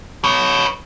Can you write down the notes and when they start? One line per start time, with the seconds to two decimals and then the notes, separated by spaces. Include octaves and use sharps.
0.24 B4 C#5